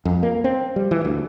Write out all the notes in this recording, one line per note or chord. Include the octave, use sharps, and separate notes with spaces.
F2
A#3
C4
G3
E3
D2